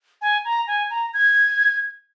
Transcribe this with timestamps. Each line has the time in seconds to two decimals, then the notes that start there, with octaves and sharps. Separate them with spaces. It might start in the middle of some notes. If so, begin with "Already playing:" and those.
0.22 G#5
0.45 A#5
0.67 G#5
0.90 A#5
1.14 G#6